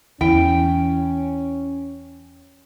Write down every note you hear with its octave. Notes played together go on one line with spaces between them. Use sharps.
E2 C#4 E4 G5